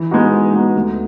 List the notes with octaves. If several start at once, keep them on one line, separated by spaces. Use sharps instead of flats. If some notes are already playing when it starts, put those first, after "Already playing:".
Already playing: E3
G#3 B3 D#4 F#4
E3
G#3 B3 D#4 F#4
D2